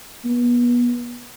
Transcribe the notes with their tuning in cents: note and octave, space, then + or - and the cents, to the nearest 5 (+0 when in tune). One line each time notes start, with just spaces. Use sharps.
B3 -30